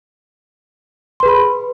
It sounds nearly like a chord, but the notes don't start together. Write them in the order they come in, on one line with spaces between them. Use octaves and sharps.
C6 B4 G#4 B5